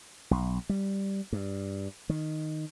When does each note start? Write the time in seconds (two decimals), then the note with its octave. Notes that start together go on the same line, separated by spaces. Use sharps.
0.31 B1
0.69 G3
1.33 G2
2.09 D#3